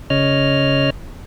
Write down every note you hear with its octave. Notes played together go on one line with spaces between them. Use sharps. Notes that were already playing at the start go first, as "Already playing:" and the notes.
C#3 C#5 D#5 F6